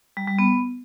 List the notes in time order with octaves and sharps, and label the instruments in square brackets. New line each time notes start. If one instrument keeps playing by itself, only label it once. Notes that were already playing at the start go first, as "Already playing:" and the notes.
[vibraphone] G3
G3
B3